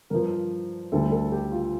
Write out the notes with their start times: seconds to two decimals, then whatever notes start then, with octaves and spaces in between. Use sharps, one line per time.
0.10 G2 F3 A#4
0.92 D2 D3 G3 A4
1.12 A4
1.32 G4
1.52 F4